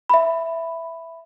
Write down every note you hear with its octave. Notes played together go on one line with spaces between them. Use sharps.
E5 B5